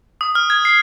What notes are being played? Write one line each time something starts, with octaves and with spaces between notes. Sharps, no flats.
D#6
F6
G#6
C7